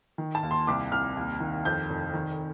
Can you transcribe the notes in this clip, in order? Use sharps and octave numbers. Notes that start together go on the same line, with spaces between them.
D#3
A5
D#2
C6
C2 D6
C2 F6
D#2
D#3
F2 G6
F1
D#3